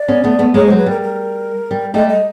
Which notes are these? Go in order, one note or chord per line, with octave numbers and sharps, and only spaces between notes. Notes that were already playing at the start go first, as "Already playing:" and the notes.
Already playing: D5
B3 C#4
A3 B3
A3 B3
G#3 A#3 C#5
F#3 C5
B4
G3 A#4
A#4
G3
G3 A3 D#5
D#5